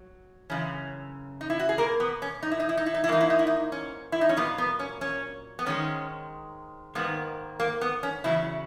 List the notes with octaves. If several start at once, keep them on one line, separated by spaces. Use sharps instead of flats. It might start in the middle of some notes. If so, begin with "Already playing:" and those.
Already playing: F#3
F#2 C#3 E3 C#4
D#4
E4
F#4
G#4
B2 A#3 A#4
B3
C#4
D#4
E4
D#4
E4
D#4
E4
D#4
E4
G#2 E3 A#3 D#4
E4
D#4
E4
D#4
C#4
E4
D#4
C#4
A#2 F#3 A#3 B3
B3
C#4
C#4
B3
G#2 D#3 G#3 C#4
G#2 D#3 A#3 B3
A#3
B3
C#4
E2 C#3 F#3 E4